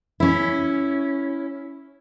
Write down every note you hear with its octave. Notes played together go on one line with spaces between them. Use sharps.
C#4 E4